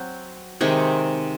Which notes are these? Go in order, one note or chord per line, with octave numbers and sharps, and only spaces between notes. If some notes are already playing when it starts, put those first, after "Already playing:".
Already playing: F#3 C4
C3 D#3 G#3